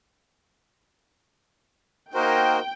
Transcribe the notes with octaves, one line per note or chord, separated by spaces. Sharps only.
A#3 D#4 F#4 A#4 C5 G5